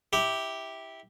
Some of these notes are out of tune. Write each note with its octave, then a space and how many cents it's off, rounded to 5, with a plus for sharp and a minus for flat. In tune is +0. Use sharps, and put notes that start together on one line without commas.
E4 -15 G4 +0